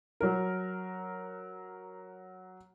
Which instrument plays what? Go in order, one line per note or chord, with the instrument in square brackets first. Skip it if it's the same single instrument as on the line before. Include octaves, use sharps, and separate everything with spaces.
[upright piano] F#3 A#4